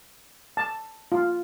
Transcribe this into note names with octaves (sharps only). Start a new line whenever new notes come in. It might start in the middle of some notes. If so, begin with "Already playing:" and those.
A5
F4